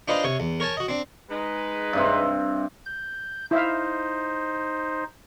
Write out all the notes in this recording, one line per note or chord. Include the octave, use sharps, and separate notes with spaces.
D4 D#4 F4 B4 C5 D#5
C3 C#5
E2
A#4 C#5 G#5 A5
F#4 D#5
C4 D4
G#3 D#4 B4
G2 C3 C4
G6
D#4 E4 C5 E5 F5